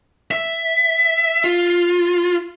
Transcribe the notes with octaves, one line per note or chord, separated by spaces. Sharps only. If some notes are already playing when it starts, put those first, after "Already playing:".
E5
F4